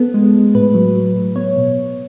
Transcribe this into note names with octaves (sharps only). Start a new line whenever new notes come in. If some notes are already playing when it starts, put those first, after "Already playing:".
Already playing: B3 A4
G#3
G#3
A2 B4
F#3
F#3
A2
B3 C#5
B2